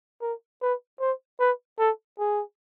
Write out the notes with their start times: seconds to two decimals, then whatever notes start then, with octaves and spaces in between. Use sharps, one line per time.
0.21 A#4
0.62 B4
1.00 C5
1.39 B4
1.79 A4
2.19 G#4